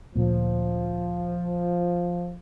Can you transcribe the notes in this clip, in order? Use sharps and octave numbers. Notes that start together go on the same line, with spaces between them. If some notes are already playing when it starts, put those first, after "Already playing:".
D2 A#2 F3 A#3